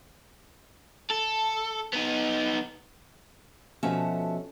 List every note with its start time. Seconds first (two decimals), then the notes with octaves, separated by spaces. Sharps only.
1.11 A4
1.93 B3 D#4
3.83 B2 F3 C#4 F#4 A4 E5